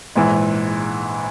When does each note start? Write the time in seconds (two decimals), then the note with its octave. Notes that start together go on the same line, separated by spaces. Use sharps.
0.15 A#1 G#2 E3